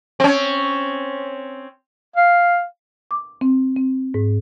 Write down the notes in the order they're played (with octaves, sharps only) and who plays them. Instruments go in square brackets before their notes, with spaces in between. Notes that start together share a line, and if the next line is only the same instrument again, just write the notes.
[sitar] C4 C#4
[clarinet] F5
[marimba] D6
C4
C4
G#2